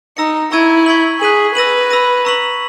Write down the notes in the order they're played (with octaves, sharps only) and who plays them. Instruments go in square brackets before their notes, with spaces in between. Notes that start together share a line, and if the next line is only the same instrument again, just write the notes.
[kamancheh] D#4 [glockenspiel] A#5 E6 A#6 C#7
[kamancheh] E4 [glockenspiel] A#5 C#6 E6 G#6 D#7
[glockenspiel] C#6 G#6 B6 F#7
[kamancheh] G#4 [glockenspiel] F#6 B6 D#7 F#7
[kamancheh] B4 [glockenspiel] E6 A#6 D#7 F#7
[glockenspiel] B5 E6 A#6 D#7
A#5 C#6 E6 B6 F#7